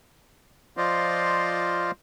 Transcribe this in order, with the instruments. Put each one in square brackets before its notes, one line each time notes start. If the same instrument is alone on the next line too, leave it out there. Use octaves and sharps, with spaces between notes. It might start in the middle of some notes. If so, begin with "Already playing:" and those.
[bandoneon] F3 F4 C5 D5 D#5 F5